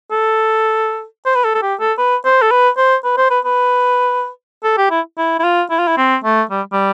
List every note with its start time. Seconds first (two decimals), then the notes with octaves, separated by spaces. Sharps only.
0.11 A4
1.25 C5
1.35 B4
1.44 A4
1.55 A4
1.62 G4
1.80 A4
1.98 B4
2.25 C5
2.42 A4
2.51 B4
2.77 C5
3.04 B4
3.17 C5
3.30 B4
3.45 B4
4.64 A4
4.77 G4
4.91 E4
5.17 E4
5.39 E4
5.44 F4
5.70 E4
5.79 F4
5.87 E4
5.97 C4
6.24 A3
6.50 G3
6.72 G3